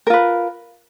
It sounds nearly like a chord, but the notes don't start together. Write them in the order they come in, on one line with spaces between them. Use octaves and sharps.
A#4 F4 B4